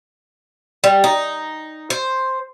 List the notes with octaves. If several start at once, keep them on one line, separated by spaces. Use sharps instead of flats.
G3
D#4
C5